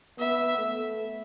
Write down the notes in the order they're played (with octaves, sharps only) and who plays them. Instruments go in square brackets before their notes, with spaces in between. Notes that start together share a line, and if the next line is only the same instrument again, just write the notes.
[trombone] B3 [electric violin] E5
[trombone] A3